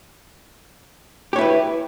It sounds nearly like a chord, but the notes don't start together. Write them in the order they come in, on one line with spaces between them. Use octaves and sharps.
G4 C#5 E4 B4